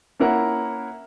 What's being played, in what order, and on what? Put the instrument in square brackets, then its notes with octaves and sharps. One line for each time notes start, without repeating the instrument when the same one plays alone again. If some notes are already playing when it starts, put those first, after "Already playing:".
[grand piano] A#3 C#4 E4 A#4 F#5